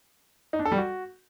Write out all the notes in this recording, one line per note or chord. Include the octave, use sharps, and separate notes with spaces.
D#4
D4
A4
G3
F#4